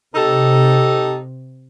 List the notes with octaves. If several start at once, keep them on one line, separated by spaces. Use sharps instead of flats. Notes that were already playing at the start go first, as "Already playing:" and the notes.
C3 D#4 G4 A4